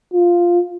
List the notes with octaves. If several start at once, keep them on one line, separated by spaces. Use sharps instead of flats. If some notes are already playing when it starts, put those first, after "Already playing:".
F4